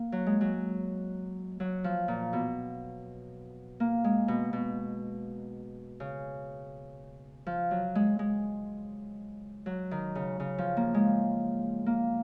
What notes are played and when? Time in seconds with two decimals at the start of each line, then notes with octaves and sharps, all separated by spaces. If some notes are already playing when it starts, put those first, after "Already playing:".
Already playing: A#3
0.12 F#3
0.26 G#3
0.41 F#3
1.60 F#3
1.84 F3
2.08 A#2
2.33 B2
3.80 A#3
4.04 G#3
4.28 B2
4.53 B2
6.00 C#3
7.46 F3
7.71 F#3
7.95 G#3
8.19 G#3
9.66 F#3
9.91 D#3
10.15 C#3
10.40 C#3
10.58 F3
10.77 A#3
10.94 G#3
11.86 A#3